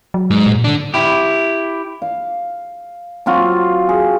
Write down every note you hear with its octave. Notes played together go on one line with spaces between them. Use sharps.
F#3
G#2
A#2
D3 D4
E4 G4
F5
F#3 C4 F4 F#4
G#4